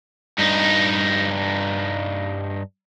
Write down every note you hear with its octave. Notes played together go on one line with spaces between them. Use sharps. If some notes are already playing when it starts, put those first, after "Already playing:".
G2 D#4